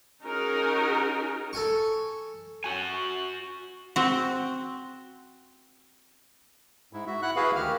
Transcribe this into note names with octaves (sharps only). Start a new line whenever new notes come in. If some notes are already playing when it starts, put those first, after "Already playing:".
C#4 D#4 F#4 G#4 A#4
A4 G#5 C#6
F#4 G#5
C4 F#4
G#2 E4
F#4 E5
E4 F#5 F#6
E4 F#4 G#4 B4 F5
D2 D#3 G4 F6